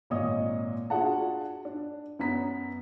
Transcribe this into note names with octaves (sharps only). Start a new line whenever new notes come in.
G#1 A#2 C#5 D#5 D#6
D4 F4 F#4 G#4 F#5 A5
D4
F#2 B3 A#5 B6